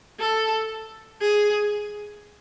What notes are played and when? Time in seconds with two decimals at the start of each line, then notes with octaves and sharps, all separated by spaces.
0.20 A4
1.21 G#4